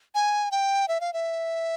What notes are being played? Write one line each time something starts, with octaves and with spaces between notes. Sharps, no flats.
G#5
G5
E5
F5
E5